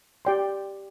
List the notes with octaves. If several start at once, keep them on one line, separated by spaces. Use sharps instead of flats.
G4 D5 G5 C6